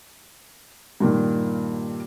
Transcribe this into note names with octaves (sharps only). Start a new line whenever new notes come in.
G2 A#2 D#3